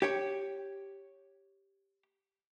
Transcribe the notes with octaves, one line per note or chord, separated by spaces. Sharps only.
G4 C#5 G5